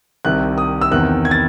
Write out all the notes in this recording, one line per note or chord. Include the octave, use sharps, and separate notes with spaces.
C2 C3 D#3 F#6
D#6
E6
E2 C3 D#3 F#6
G#6
A6